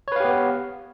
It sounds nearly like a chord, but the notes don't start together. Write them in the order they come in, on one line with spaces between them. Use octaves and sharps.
C#5 B4 F5 G4 B3